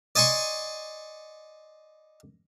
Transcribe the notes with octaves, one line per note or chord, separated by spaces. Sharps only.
D5 D#5 G#5 C6 C#6